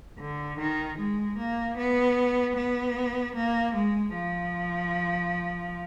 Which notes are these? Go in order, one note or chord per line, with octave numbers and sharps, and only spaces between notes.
D3
D#3
G#3
A#3
B3
B3
A#3
G#3
F3